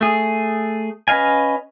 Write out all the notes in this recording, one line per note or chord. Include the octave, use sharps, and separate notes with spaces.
A3 G#4
C#4 B4 D#5 F5 G#5